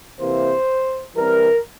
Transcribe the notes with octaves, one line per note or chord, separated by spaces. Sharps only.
C3 E3 A#3 C5
E3 G3 C4 A#4